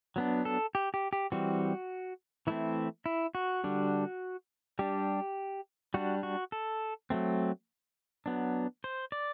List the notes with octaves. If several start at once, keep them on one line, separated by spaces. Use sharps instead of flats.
F#3 B3 D4
A4
G4
G4
G4
E3 G3 C4 F#4
E3 A3 C4 E4
E4
F#4
D3 G3 D4
G3 D4 G4
G3 D4 F#4
F#4
A4
F#3 A3 C4
F#3 B3 D4
C5
D5